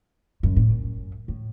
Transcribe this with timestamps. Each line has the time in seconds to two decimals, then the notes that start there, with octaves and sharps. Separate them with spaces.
0.43 F#2
0.56 A2
0.69 F#2
1.28 A2